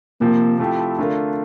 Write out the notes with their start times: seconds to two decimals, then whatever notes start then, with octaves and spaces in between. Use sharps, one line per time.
0.21 C3 F3 A#3 C4
0.59 F3 A3 C4 E4 G4
0.98 D3 A3 D4 F4 A#4